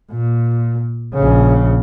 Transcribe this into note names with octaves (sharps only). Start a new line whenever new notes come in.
A#2
A#1 C#3